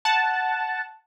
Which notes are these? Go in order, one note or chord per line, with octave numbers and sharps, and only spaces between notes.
F#5 A5